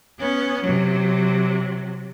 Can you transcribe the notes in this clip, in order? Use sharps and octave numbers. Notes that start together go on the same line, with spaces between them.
B3 C#4
C3 F#3